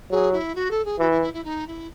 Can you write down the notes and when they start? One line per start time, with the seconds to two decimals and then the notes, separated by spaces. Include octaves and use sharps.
0.10 F#3 G#4
0.32 E4
0.55 F#4
0.70 A4
0.85 G#4
0.99 E3 F#4
1.11 E4
1.21 E4
1.33 E4
1.44 D#4
1.67 E4